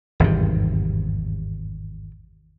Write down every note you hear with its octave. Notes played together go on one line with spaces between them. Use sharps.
G#1 E2 G2 C3